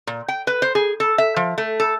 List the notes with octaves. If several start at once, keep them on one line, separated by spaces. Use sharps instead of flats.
A#2
G5
B4
C5
G#4
A4
E5
F3
A3
A4